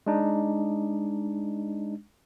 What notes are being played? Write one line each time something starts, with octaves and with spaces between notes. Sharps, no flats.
G#3 D4 D#4